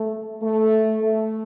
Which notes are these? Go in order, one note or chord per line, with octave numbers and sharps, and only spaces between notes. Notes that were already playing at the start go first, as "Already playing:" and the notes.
Already playing: A3
A3
A3